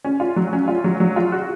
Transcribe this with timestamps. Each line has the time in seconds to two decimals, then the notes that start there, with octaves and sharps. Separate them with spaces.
0.04 C#4
0.20 F4
0.36 F#3
0.53 C#4
0.68 F4
0.84 F#3
1.00 F#3
1.16 F4
1.32 F#4